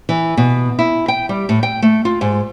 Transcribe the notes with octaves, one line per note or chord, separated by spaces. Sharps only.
E3
B2
E4
G5
G3
A2
G5
A3
F4
G#2